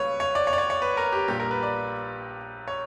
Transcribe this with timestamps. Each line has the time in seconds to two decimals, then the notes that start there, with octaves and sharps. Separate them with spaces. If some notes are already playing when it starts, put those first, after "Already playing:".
Already playing: C#2 C#3 G3 A#3 B4 C#5
0.20 C#5
0.35 D5
0.47 C#5
0.53 D5
0.58 C#5
0.70 C#5
0.82 B4
0.97 A#4
1.12 G4
1.28 A#1 A#2 G3 A#3 G4
1.40 A#4
1.51 B4
1.63 D5
2.68 C#5